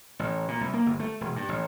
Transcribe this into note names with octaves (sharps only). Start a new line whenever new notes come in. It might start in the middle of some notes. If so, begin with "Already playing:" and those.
A1
A#2
C2
A#3
G1
A3
E1
G2
A1